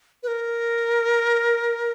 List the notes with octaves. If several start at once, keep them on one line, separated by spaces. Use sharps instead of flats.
B4
A#4